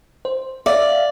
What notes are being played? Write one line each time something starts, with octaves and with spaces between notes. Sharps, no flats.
C5
D5 E5 F5